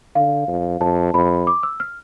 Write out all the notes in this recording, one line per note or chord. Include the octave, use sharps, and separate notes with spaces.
D3 F5
F2
F2 A5
F2 B5
D6
E6
F6